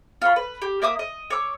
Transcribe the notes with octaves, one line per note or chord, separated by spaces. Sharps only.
F4 C#5 B5
B4
G4
A#3 E5 D6 D#6
D#5
C#5 D6 E6